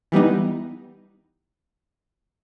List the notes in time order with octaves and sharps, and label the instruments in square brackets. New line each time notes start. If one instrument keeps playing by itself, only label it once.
[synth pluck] E3 G3 B3 D#4